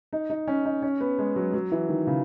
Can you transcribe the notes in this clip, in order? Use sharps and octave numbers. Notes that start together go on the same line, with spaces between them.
D#4
D#4
C#4
D#4
C#4
B3
G#3
F#3
F#3
E3
D#3
C#3